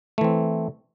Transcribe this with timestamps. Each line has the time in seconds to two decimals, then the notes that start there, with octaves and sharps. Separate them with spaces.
0.18 A3
0.21 E3
0.24 C4